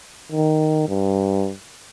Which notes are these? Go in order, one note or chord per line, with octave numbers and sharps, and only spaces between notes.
D#3
G2